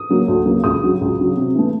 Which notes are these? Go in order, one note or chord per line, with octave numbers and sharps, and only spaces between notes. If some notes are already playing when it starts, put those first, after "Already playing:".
Already playing: D#6
C#3 F#3 A#3
D2
C#3 F#3 A#3
C#2 D#6
C#3 F#3
C#2
C#3 F#3
C3
E3 A3